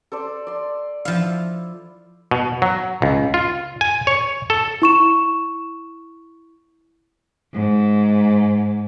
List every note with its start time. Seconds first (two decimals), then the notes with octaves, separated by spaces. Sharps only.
0.12 A4 C5 D5
0.47 D5 C6
1.05 F3 E4 F5
2.31 B2
2.62 F#3
3.02 C#2
3.34 F4
3.81 G#5
4.07 C#5
4.50 A4
4.82 E4 C#6 E7
7.54 G#2